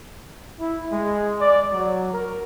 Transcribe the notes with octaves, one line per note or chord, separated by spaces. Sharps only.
E4
G#3
D5
F#3
A#4